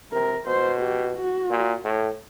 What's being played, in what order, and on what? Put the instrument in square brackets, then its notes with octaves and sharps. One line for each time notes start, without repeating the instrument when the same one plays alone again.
[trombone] C3 [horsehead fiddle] A#4
[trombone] B2 [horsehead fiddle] C5
[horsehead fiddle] G4
F#4
[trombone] A#2
A2